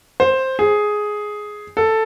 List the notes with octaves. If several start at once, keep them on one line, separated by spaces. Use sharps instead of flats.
C5
G#4
A4